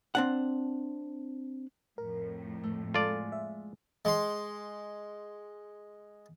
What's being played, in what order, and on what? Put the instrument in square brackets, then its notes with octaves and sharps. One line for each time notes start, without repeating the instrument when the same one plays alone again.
[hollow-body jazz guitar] C4 D4 F#5
[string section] F2 A2 [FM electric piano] A#4
[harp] A3
[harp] G#3 [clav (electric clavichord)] F4 D5 [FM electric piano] A4
[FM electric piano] E5
[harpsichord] G#3 C6